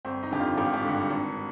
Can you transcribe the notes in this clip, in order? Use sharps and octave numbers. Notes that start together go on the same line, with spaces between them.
G1 C4
D#4
F2 D3 G4
F4
G#1 G4
F4
G4
G2 D3
G#1